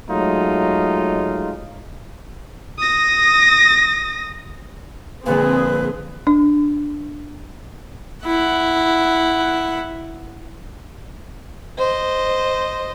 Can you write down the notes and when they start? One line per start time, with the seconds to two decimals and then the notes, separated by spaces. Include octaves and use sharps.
0.11 F#3 G#3 A3 D#4 F4
2.79 D#6 A#6
5.26 A#2 D3 F3 C4 G#4 B4
6.27 D4
8.26 E4 F#5
11.78 C5 D#5